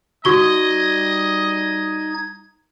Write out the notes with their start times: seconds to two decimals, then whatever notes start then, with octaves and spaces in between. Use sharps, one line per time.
0.25 G3 D#4 F#4 D#5 C#6 G#6 G7